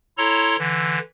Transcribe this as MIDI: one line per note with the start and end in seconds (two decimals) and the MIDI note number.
0.18 0.57 64
0.18 0.57 69
0.18 0.57 73
0.18 0.57 82
0.18 0.57 84
0.59 0.99 50
0.59 0.99 52